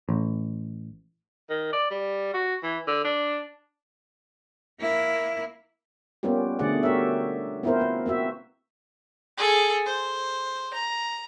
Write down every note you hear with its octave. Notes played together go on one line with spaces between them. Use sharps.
A1
D#3
D5
G3
F#4
E3
D3
D4
A#3 E4
G3 A#3 B3 C#4 F4 G4
B2 D3 A3 G#4 D5 F#5
F#4 G4 A#4 C#5 E5
B3 C4 E4 F4 A#4 C5
A#3 B4
A#3 C4 F#4 E5
G#4 A4
C5
A#5